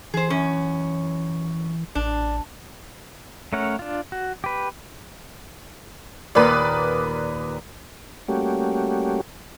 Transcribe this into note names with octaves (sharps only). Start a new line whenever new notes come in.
E3 G#4 C5
F#2 C#4
A1 D4
A3 C#4 A#4 C#5 F#5
D4 F4
F#4
G4 B4
D#2 A#2 B4 D5 D#6
G3 A3 A#3 C#4 F#4 G4